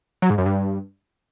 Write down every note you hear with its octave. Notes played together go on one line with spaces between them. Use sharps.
F#3
G#2
F#2
G2